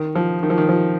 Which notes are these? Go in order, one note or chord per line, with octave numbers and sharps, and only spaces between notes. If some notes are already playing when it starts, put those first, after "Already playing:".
Already playing: D#3
F3
D#3
F3
D#3
F3